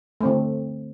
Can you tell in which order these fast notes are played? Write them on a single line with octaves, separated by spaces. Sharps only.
A3 C4 D3